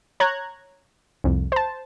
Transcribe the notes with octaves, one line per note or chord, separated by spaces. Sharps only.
C#5 A#5 F#6 G#6
C2 F2
C5 A5